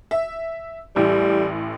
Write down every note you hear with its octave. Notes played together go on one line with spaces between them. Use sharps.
E5
A1 A2 G3